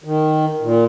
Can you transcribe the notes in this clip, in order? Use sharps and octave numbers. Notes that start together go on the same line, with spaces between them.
D#3
A#2